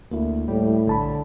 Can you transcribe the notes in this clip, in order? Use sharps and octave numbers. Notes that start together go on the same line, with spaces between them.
D2 A#3 E4
A2 G3
A#1 D3 A5 B5